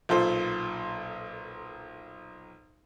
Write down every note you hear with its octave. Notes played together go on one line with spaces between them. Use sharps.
B1 A#2 A4 C5